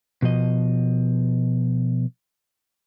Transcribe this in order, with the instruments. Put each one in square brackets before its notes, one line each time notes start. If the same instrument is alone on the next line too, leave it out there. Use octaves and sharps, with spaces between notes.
[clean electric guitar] B2 F3 D#5